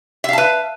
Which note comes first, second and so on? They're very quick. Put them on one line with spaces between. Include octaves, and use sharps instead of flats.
E5 F5 A5 B4